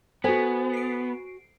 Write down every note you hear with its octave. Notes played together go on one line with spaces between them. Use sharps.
B3 F#4 A4 C5 G#5
C7 D7